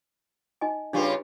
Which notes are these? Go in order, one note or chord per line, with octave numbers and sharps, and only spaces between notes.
D#4 D#5 G#5
C#3 G3 D4 F4 G4 B4